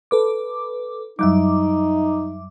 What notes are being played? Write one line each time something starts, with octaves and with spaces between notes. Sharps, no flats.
A4 B4 D6
F#2 F#3 G3 D#4 E5 D6